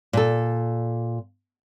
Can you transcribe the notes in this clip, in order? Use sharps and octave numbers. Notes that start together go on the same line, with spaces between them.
A#2 A4